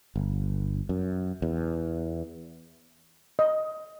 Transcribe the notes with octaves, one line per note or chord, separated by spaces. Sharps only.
G1
F#2
E2
D#5